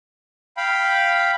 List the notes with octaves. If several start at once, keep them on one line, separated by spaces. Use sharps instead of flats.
F5 G5 B5